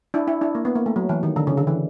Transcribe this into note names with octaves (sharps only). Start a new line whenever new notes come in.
D4 E4
D4 E4
D4 E4
A#3
B3
A#3
A3
F#3
E3
D#3
D3
C#3
D3
E3